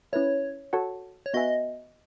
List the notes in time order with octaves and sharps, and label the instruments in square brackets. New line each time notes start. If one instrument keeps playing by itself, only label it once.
[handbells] C#4 E4 B4 E5 [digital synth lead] C#5
[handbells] F#4 A4 C#5 F#5 A5
[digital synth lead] C#5
[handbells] B3 F#4 B4 E5 G#5 [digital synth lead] D#5